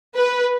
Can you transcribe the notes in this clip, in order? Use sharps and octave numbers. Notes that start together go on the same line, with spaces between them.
B4